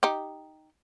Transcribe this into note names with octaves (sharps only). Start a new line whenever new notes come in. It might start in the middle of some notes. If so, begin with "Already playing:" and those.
D#4 G4